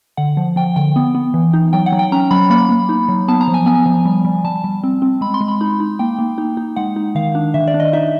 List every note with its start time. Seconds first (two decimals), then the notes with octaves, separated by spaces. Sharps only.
0.17 D3 F#5
0.37 F3
0.56 F3 G5
0.76 D3 G5
0.96 B3
1.15 B3
1.34 E3
1.54 D#4
1.73 F#3 G5
1.86 F#5
1.92 F#3
1.99 G5
2.12 C#4 A#5
2.31 F#3 B5
2.50 A#3 B5
2.69 A#3
2.89 D#4
3.09 F#3
3.28 B3 A5
3.41 A#5
3.48 F3
3.54 G#5
3.66 B3 G#5
3.86 F3
4.05 G3
4.25 G3
4.45 G3 A5
4.64 G3
4.84 C4
5.02 C4
5.21 G#3 B5
5.34 C6
5.41 G#3
5.48 B5
5.61 D#4 B5
5.80 D#4
5.99 A#3 G5
6.19 A#3
6.38 D#4
6.57 D#4
6.76 G#3 F#5
6.96 D#4
7.15 D#3 F5
7.35 D4
7.54 D#3 E5
7.68 D5
7.74 D4
7.80 D#5
7.93 D#4 E5